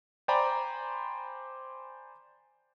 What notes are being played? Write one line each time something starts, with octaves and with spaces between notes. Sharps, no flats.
C5 D5 G5 G#5 A#5 B5